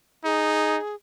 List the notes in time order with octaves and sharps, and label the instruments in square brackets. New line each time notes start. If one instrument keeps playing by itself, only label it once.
[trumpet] D#4 [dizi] G#4